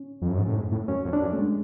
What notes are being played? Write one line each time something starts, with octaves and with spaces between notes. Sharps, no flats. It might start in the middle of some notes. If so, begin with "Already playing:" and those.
Already playing: C#4
F2
F#2
G#2
A2
G#2
A2
F#2 C#4
F2
D4
F#2
A3
G#3